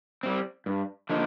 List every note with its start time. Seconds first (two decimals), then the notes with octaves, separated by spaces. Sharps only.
0.23 G3 C4
0.66 G2
1.09 D3 F3 A#3 D#4